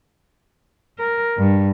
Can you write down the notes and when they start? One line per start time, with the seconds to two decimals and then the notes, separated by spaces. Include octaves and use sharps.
0.98 A#4
1.38 G2